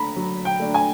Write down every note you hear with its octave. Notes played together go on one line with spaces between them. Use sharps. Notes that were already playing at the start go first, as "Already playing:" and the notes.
Already playing: A3 D4 A#5 B5
F#3
G5
A3 D4
G#5